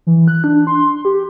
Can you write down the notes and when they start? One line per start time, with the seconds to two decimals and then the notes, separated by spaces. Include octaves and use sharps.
0.07 E3
0.28 F#6
0.44 D4
0.67 C6
1.05 G4